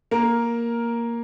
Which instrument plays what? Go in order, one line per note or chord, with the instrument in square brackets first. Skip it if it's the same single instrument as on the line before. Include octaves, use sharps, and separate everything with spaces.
[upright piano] A#3 A#4